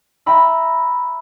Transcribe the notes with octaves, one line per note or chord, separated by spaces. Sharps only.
E5 G5 A#5 B5 E6